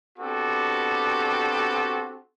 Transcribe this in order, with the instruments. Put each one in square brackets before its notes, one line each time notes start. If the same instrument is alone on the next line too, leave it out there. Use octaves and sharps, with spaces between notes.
[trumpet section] B3 C4 D4 F#4 G4 A4